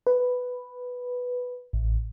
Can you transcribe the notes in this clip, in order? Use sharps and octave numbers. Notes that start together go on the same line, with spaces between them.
B4
A1